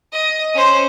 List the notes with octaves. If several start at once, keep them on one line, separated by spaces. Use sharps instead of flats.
D#5
C#4 C5